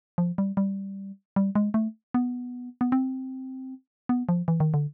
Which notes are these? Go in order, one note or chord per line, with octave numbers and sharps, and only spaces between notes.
F3
G3
G3
G3
G#3
A3
B3
B3
C4
B3
F3
E3
D#3
D3